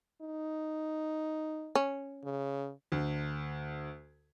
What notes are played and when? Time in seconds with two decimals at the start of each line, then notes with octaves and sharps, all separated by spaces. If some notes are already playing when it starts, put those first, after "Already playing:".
0.21 D#4
1.75 C#4
2.24 C#3
2.92 D2